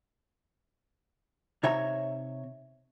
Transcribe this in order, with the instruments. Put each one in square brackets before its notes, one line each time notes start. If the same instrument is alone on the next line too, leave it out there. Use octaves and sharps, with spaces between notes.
[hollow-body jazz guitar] C3 D#4 C#5 E5 A#5